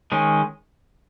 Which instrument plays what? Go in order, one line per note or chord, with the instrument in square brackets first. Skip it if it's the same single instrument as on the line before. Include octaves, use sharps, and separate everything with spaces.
[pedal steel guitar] D#3 G#3 C#4